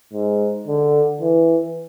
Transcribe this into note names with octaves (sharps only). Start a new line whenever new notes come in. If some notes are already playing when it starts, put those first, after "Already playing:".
G#2
D3
E3